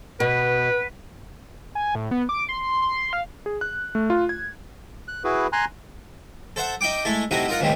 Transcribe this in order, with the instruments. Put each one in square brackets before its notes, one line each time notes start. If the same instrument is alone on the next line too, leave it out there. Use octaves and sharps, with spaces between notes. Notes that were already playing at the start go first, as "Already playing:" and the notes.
[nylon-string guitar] B2 [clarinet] B4
[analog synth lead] G#5
A2
B3
D6
C6
C6
F5
[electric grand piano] G#4
F#6
A3
F4
G#6
[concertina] F#6
E4 F#4 G#4 B4
G#5 A#5 C6 F#6
[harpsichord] A4 C5 E5 F#5
D#4 E5 G5 D6
G#3 A3 E4 A4
C3 A3 D#4 E4 F#4 A#4
D#4 F4 A#4 F5 F#5
C#2 A2 C3 D#3 G3 G#3